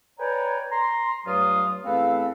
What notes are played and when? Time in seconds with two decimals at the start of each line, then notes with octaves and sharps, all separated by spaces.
0.19 B4 C#5 D5 G5 G#5 A#5
0.71 A#5 C6
1.26 G2 F#3 A3 F4 D#6
1.85 E2 A3 C4 A4 B4 F5